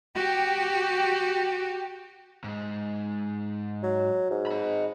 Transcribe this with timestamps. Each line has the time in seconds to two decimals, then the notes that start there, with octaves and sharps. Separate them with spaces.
0.15 F#4 G4
2.44 G#2 G#3
3.83 F#3
4.31 G#2
4.47 D#5 B5